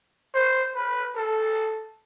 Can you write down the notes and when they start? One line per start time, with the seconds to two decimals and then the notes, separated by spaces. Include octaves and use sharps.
0.34 C5
0.74 B4
1.16 A4